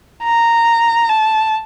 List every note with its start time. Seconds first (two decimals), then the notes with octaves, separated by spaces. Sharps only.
0.24 A#5
1.09 A5